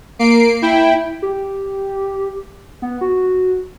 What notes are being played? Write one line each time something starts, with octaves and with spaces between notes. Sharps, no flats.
A#3 C7 D7
E4 G5
G4
B3
F#4